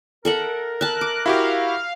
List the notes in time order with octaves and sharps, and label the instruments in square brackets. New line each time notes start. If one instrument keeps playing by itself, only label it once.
[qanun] A4 E5 F#5 [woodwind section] A#4
[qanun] E5 A5 [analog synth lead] F#6
[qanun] D6
[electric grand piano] E4 F#4 G4 [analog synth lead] F5